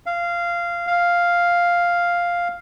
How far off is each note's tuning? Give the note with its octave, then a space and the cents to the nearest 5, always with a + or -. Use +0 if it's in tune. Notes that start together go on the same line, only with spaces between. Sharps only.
F5 -15
F5 +0